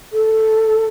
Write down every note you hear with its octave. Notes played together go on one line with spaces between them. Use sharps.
A4